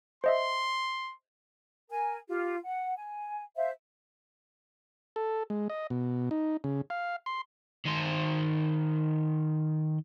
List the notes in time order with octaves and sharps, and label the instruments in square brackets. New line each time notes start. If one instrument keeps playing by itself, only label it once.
[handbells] C5 D#5 E5 [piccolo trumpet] C6
[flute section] A#4 G#5
F4 G4
F#5
G#5
C5 E5 F5
[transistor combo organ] A4
G#3
D#5
B2
D#4
C#3
F5
C6
[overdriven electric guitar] D#3 C5